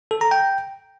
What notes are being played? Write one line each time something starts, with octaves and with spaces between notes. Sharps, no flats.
A4
A#5
G5